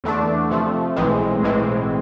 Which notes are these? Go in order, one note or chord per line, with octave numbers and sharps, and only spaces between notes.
E2 D3 A3 D4
C3 F3 A3
B1 A2 E3 G#3 C4
B1 A2 E3 G#3 C4